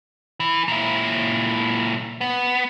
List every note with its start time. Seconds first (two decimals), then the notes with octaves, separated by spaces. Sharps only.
0.40 E3
0.68 A#2 E4
2.21 B3